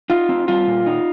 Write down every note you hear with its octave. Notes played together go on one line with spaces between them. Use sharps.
D#4 F4
C4
G3 F4
A#2
D#4